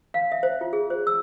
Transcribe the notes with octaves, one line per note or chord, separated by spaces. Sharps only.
F5
E5
C5
F4
G#4
C5
E6